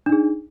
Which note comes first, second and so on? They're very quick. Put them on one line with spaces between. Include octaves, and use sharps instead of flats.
D4 D#4 G#4